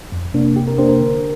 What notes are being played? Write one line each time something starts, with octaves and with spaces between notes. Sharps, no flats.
F2
C3 A#3 D4
C3 G4
A#4
A#3 D4 G4 C5
A#4
D3